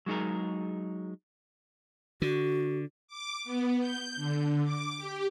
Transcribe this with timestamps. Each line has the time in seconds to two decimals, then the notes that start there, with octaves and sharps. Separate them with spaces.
0.06 F#3 G#3 D#4 G#4 A#4
2.22 D3 F#4
3.07 D6
3.44 B3
3.80 G6
4.16 D3
4.64 D6
4.97 G4